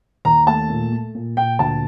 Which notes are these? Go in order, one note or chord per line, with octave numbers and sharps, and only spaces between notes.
D#2 A#5
A3 A5
A#2
A3
A#2
A#2 G5
D2 A5